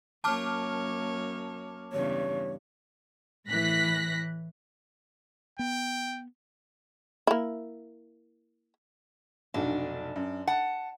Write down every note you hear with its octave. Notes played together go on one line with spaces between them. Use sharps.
F#2 A#3 C#5 A5 D6 F6
E2 G2 C#3 C#5
A2 E3 F#6 A#6 B6
B3 G5
A#3 E4
F1 B1 D4 F#4
F#2
F#5 A5